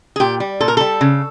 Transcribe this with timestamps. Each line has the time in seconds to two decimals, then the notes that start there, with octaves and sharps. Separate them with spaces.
0.16 G#4
0.20 A#2 G4
0.40 G3
0.61 A#2 A4
0.68 A#4
0.77 G3 A4
1.01 C#3